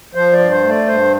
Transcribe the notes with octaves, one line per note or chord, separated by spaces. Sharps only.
F3 C5
D5
G2
C5
A3
D5
G2 C5